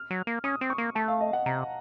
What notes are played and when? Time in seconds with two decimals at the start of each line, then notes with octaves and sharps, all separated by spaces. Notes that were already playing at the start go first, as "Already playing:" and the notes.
Already playing: F6
0.11 F#3
0.27 A#3
0.44 C#4 D#6
0.61 C4
0.70 C#6
0.78 A#3
0.95 A3 A5
1.08 F5
1.21 D#5
1.33 F#5
1.46 C3 A#5